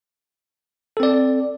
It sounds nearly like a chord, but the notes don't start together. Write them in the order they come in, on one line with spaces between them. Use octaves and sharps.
A4 C4 D5